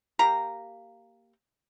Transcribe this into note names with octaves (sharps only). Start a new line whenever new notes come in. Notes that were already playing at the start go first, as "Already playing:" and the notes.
A#3 G4 A#5